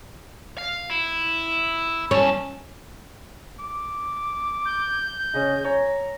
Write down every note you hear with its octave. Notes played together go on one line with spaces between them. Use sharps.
F5
E4
E2 C#4 A5
D6
G6
C#3 C#4 D#5
C#5 G#5 A#5